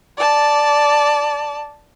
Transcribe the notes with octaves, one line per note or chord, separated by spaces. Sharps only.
D5 A5